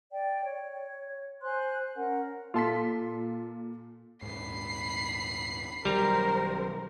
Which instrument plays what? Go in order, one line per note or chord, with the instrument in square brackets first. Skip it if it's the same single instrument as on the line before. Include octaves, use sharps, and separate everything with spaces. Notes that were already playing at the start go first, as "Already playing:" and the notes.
[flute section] D5 G5
C#5
C5 G#5 C6 F#6
C#4 A#4 F#5
[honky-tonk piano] A#2 C6 B6 [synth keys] F4 A4
[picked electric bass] D#1 G#2 [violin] B5 C7
[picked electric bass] B1 D#3 F#3 [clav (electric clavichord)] G3 A#5 [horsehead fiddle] A#4 C5